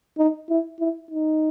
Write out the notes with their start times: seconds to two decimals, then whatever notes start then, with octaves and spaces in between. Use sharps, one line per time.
0.18 D#4
0.50 E4
0.80 E4
1.11 D#4